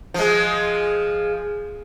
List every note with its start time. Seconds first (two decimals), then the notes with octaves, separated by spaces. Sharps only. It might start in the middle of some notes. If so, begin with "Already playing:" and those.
0.14 F3 G#3